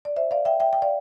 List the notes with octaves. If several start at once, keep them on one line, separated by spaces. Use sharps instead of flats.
D5
C5 E5
D5 F5
E5 G5
E5 G5
G5
D5 F5